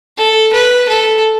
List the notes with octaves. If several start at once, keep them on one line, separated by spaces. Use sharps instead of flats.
A4
B4
A4